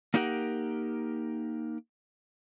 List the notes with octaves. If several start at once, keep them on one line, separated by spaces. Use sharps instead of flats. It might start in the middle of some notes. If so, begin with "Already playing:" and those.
A#3 D4 D#4 G4 A#4 F#5